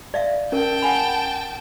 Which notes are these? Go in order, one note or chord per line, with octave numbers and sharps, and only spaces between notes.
D5 E5 F5
C#4 A#4 G5 A5
F#5 G#5 B5